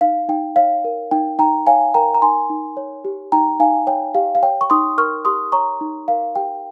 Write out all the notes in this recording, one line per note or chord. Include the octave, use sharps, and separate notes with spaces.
D#4 F5
D#4 G5
C#5 F5
A#4
D#4 G5
D#4 G5 A#5
C#5 F5 G#5
A#4 G5 A#5
A#5
D#4 G#5 C6
D#4
C#5
G4
D#4 G5 A#5
D#4 F5 G#5
C#5 G5
G4 F5
F5
C#5 G5
C#6
D#4 C6 D#6
A#4 C#6 F6
G4 C6 D#6
C#5 A#5 C#6
D#4
A#4 F5
G4 G5